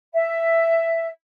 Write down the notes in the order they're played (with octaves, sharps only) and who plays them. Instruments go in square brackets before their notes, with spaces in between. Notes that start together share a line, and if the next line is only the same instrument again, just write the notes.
[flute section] E5